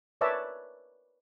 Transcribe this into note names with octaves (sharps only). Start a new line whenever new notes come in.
A#4 B4 C#5 D5 E5 A5